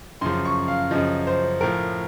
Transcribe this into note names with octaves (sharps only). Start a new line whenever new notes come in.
F#2 C#3 F3 C6
C#6
F5
F#2 C#3 F3 D#5
C5
A2 F3 A#4